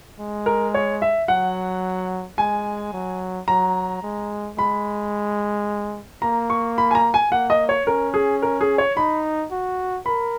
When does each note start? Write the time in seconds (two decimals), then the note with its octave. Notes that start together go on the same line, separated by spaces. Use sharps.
0.20 G#3
0.46 A#4
0.74 C#5
1.02 E5
1.28 F#3 F#5
2.38 G#3 G#5
2.93 F#3
3.48 F#3 A#5
4.03 G#3
4.57 G#3 B5
6.22 A#3 A#5
6.50 C#6
6.78 B5
6.91 G#5
6.95 A#5
7.14 G#5
7.32 A#3 F#5
7.50 D#5
7.69 C#5
7.86 C#4 A#4
8.14 G#4
8.42 A#4
8.61 G#4
8.78 C#5
8.97 D#4 B5
9.51 F#4
10.06 A#4 B5